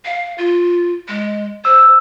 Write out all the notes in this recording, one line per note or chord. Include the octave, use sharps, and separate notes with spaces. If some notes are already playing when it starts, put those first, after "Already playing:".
F5
F4
G#3
C5 E6